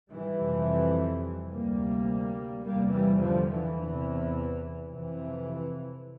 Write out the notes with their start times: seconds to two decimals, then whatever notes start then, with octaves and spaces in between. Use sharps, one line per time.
0.10 E3 G3
0.39 F2 C3
1.51 D2 C3 G3 A#3
2.64 E2 C3 G3 A#3
2.92 E3 G3
3.20 D3 F3
3.49 E3
3.77 E2
3.82 C3
4.90 F2 C3 E3